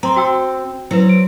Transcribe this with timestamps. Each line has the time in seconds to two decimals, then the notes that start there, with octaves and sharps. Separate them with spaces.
0.03 C4 A#5 C6
0.16 F#4 G5 E6
0.91 F#3 C4 E4 B4
1.09 D7